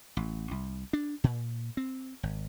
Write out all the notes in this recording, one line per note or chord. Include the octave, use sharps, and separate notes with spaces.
A1
C2
D4
A#2
C4
G#1